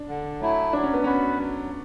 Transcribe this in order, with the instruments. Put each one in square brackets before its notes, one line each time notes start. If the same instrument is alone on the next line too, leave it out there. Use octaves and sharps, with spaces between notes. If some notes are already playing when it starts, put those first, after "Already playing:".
Already playing: [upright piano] D4
[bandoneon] D3
F#3 A3 E4
[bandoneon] F#3 [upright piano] D4
[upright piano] C#4
B3
[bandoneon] B3 F#4 B4 [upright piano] C#4
[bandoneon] F#3